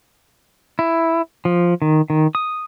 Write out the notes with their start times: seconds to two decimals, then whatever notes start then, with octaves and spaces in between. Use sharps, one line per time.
0.79 E4
1.45 F3
1.82 D#3
2.10 D#3
2.35 D#6